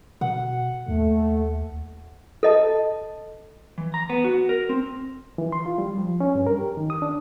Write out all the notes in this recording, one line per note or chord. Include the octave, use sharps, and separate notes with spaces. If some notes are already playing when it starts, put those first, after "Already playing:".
B2 F#5
D#2 A3
A4 D#5 A5
E3
A#5
B3
F#4
A#4
C4
E3
C6
F4
G3
F3
C#4
G2
A#4
G4
D#3
D#6
D4